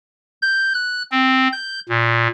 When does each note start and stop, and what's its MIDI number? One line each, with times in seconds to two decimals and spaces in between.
0.42 0.73 91
0.74 1.02 90
1.12 1.48 60
1.52 1.80 91
1.89 2.27 46